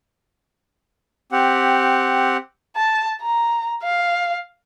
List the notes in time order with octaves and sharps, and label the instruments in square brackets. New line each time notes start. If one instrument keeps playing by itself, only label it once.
[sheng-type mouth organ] C4 G4 F#5
[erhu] A5
A#5
F5